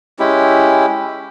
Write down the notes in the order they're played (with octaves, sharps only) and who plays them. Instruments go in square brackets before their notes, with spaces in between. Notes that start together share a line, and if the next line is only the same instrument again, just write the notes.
[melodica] G#3 C#4 E4 G4